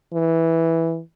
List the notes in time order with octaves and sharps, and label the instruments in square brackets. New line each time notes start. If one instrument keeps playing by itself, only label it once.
[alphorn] E3